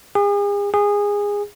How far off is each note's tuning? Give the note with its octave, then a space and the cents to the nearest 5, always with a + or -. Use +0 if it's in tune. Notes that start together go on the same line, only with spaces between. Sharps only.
G#4 -40
G#4 -20